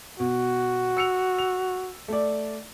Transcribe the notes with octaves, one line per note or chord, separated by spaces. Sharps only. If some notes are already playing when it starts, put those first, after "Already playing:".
B2 F#4
E6 C#7 F7
F7
A3 D5